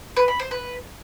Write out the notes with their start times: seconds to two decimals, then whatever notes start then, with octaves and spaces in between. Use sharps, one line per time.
0.17 B4
0.28 B5
0.40 C5
0.51 B4